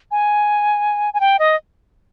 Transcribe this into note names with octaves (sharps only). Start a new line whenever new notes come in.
G#5
G#5
G5
D#5